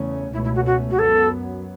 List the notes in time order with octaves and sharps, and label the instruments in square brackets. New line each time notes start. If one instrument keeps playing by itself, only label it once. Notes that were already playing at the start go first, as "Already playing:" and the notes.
Already playing: [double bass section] E2 C#3 A3 C#4
[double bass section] C#2 B2 A3 C#4 [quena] E4
[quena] E4
F#4
F#4
F#4
[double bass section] F#2 F#3 B3 [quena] A4